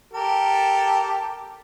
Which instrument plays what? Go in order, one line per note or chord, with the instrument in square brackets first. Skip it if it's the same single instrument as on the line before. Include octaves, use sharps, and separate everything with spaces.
[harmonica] G4 A4 A#4